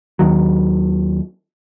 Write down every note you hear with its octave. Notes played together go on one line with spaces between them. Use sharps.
D#2 D#3 F#3